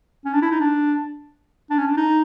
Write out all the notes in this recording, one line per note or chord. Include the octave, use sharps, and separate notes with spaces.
C#4
D4
E4
D#4
D4
D4
C#4
D4
D#4